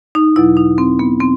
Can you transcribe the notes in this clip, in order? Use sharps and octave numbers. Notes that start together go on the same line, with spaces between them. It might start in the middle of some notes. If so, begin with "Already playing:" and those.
D#4
E2 B2 F#3 E4
D#4
C4
B3
E3 C4